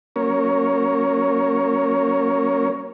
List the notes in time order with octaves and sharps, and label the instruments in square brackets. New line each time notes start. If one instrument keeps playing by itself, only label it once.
[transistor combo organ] F#3 A#3 C#4 A#4 C#5